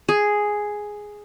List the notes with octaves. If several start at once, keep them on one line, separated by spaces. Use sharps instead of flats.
G#4